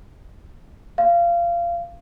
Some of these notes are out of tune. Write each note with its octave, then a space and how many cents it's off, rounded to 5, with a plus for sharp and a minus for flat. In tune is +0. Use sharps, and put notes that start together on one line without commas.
F5 -25